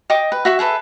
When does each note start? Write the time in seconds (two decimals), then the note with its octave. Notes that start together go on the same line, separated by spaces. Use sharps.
0.10 D#5 G5 D6
0.32 B4
0.45 F#4 E5 C#6
0.59 G#4 A4 B4 E5